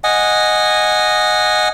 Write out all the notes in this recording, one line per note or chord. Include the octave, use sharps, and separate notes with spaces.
D#5 F#5 G#5